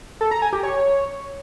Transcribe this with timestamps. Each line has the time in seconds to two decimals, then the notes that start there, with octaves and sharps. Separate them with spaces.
0.21 A4
0.31 A#5
0.42 G#5
0.53 G4
0.63 C#5